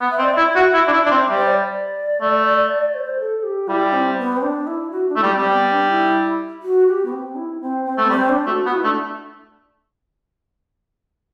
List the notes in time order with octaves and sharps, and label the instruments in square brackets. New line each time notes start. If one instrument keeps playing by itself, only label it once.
[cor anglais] B3
[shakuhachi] E5
[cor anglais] C4
[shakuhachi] D5
[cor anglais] E4 [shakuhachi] E5
[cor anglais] F#4
E4
D4
E4
D4
C4
G3
[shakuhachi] C5
D5
[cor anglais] A3
[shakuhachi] C5
A4
G4
[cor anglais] G3 [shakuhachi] E4
[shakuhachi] C4
B3
C4
D4
E4
F#4
D4
[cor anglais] A3 [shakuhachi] E4
[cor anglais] G3
[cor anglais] G3 [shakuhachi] C4
[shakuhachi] B3
D4
E4
F#4
G4
B3
C4
E4
C4
C4
[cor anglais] A3
[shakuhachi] B3
[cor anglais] G3 [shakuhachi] C4
[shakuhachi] D4
[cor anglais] A3 [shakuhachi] F#4
[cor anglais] B3 [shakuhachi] F#4
[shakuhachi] E4
[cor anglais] A3 [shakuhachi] D4